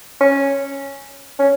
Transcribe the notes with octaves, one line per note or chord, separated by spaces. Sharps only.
C#4
C#4